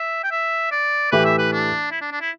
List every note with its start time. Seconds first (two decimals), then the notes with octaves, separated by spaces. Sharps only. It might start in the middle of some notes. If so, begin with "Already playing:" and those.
Already playing: E5
0.23 G5
0.31 E5
0.72 D5
1.12 A2 E3 A3 G4 B4
1.25 E5
1.38 B4
1.52 D4
1.91 E4
2.01 D4
2.11 D4
2.21 E4